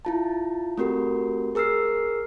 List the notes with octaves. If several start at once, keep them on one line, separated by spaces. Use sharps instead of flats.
E4 F4 A5
A3 C4 F#4 G4 A#4
G#4 A#4 E6 F6 C7